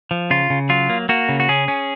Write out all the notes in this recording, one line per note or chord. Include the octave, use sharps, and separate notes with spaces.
F3
C#3 F4
C#3
F#3 F4
A#3
A#3 F#4
C#3
F#4
C#4 G#4
C#4